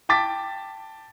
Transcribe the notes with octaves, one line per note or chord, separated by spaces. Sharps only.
G5 A5 D6 A6 B6